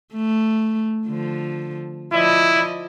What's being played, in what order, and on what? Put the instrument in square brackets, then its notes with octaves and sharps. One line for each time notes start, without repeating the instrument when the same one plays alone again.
[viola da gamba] A3
D3 F3
[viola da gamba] F3 D5 D#5 [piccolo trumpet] E4